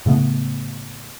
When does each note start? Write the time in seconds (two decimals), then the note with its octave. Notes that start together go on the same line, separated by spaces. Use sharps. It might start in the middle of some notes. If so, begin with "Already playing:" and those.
0.06 A2 C#3 A3 B3